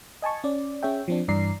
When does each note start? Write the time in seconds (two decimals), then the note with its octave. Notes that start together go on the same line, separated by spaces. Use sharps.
0.22 D#5 G#5 A5 C#6
0.44 C#4 D5
0.83 C#4 G#4 C#5 E5 G5
1.08 F3 C4 D4
1.28 G2 E3 D5 A#5 C7